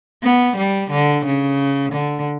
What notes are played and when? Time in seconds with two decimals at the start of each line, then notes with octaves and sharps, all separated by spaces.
0.23 B3
0.57 G3
0.90 D3
1.25 C#3
1.92 D3